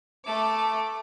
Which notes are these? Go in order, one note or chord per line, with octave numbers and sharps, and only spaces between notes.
A3 D6